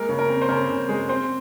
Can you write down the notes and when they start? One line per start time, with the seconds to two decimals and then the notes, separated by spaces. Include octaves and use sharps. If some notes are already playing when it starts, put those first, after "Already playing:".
Already playing: G#3 A#3 A#4
0.09 C#3
0.19 A#4
0.29 C4
0.42 C5
0.49 C#3 A#4
0.69 C#3
0.89 G#3
1.09 C4 C5